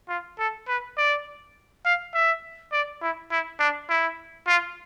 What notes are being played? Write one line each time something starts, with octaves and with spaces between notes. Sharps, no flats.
F4
A4
B4
D5
F5
E5
D5
E4
E4
D4
E4
F4